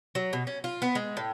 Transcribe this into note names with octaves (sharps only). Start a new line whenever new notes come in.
F#3
B2
C#4
F4
B3
G#3
A2